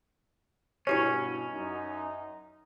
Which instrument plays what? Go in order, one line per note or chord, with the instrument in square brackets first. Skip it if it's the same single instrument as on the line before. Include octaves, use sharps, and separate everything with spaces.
[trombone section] G2 B2 [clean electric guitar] C#4 [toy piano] E4 G4 C#5
[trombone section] F#2 D#4